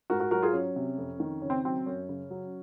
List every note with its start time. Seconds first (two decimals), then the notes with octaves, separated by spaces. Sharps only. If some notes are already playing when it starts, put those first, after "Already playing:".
0.10 G#2 F#4 A#4
0.20 F#4 A#4
0.31 F#3 F#4 A#4
0.42 F4 G#4
0.53 F#3 C#4
0.76 C3
0.98 F2
1.20 D#3
1.42 C#3 C#4
1.50 C4
1.64 F#3 C4
1.86 F#2 C#4
2.09 C#3
2.30 F#3